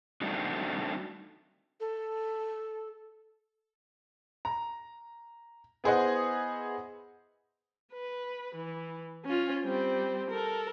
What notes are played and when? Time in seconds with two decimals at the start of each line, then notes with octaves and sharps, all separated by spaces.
0.21 G3 A3 C4 D4 D#4 F#4
1.80 A4
4.45 A#5
5.84 B3 E4 G#4 C5 D#5 F#5
7.93 B4
8.55 E3
9.25 C#4 F4
9.64 G3 C4
10.30 A4 A#4